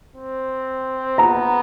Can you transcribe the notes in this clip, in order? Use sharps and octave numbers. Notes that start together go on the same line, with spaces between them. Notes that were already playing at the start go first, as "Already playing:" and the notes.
C4
B3 A#5